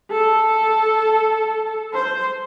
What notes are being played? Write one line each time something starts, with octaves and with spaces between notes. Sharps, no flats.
A4
C5